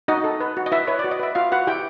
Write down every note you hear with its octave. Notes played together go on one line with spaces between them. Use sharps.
D#4 F#4 D#5
A4
B4
F#4
D#5
E4 B4 E5
B4 C#5
D5
F#4
D#5
B4 E5
F4 F#4 F5
F#4 B4 F#5
E4 G4 G5